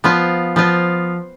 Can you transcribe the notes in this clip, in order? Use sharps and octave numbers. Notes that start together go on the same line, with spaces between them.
F3 B3 F4
F3 B3 F4